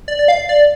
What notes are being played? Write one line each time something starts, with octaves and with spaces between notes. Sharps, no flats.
D5
D5
F5
D5